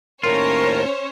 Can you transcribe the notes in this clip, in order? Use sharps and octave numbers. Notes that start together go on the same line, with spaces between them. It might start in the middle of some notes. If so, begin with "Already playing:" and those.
D#2 A2 C#4 F4 A#4 C5 C#5